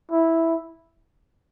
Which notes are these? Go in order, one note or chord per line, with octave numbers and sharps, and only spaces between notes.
E4